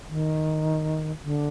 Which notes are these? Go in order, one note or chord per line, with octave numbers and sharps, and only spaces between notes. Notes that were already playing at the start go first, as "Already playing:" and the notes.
D#3
D3